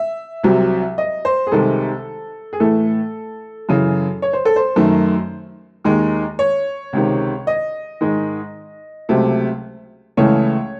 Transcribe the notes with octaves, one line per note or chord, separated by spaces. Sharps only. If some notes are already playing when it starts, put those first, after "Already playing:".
Already playing: E5
C2 C3 F#3
D#5
C5
G#4
C2 C3 D#3 G#3 A4
G#4
A2 E3 A3 A4
F#2 C#3 E3
C#5
C5
A4
C5
F#2 D#3 A3
D#2 D#3 G#3
C#5
C#2 C3 D#3
D#5
G#2 D#3 G#3
C#2 C3 F#3 A3
C#2 C#3 E3 A3 C#5